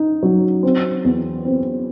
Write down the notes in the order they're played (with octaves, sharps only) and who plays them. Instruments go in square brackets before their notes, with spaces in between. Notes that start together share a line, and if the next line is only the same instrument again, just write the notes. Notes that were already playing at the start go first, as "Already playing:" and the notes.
Already playing: [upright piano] D#4
F#3
C4
E2
C4